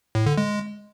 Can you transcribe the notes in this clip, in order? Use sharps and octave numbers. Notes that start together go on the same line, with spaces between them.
A2
D3
G#3